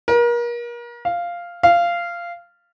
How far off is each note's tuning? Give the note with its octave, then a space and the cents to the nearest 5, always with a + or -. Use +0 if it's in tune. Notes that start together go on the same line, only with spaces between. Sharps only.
A#4 +35
F5 -5
F5 -15